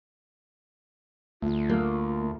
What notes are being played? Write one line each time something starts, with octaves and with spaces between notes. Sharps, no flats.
D2 A3 F4
A#3